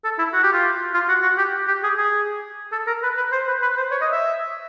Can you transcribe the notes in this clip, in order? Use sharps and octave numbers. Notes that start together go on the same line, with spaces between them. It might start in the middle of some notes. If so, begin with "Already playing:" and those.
A4
E4
F#4
G4
F4
F4
F#4
F#4
G4
G4
G#4
G#4
A4
A#4
B4
B4
C5
B4
B4
C5
C#5
D#5
E5